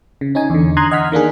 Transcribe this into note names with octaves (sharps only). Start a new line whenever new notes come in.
C#3
C#4 D#4 G#5
E2 D3
A#5 C6 D#6 F#6 G#6
D#5 F#5 F6 B6
D#3 A#3 D4 G#4